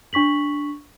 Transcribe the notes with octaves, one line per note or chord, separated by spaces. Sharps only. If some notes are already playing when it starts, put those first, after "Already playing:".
D4 C#6 B6 F#7